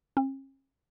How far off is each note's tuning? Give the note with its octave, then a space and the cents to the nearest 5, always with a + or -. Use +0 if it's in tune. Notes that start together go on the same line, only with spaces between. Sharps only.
C#4 -45